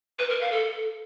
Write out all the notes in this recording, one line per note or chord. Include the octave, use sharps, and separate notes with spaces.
B4
A#4
F5
A4